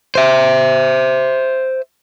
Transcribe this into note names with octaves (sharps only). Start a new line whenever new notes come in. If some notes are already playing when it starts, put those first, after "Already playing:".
C5 E5